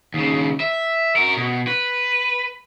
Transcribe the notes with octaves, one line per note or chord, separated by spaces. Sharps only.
D#2 C#3
E5
F#4 A#4
B2
B4